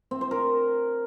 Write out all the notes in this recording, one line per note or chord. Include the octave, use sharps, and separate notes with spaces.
C4
C5
A#4